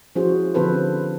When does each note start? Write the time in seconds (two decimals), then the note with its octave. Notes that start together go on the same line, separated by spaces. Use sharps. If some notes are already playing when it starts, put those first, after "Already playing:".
0.16 F3 C#4 E4 F#4 G#4 C5
0.54 D3 F3 C4 A4 B4 C5